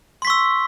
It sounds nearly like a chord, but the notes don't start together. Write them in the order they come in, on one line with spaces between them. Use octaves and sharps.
C6 B6 C#6 E6